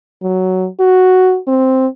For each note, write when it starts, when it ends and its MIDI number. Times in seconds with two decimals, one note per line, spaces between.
0.23 0.68 54
0.80 1.38 66
1.48 1.87 60